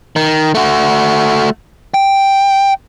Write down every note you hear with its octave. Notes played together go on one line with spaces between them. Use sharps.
D#3
A3 F#4
G5